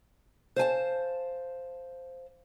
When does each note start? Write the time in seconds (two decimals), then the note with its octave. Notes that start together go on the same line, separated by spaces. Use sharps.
0.56 C5 F5 G#5 A5